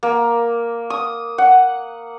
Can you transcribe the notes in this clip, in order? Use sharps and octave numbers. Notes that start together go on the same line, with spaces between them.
A#3
D#6
F#5